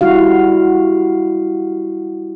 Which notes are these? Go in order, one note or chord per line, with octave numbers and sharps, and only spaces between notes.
G3 E4 F#4 F5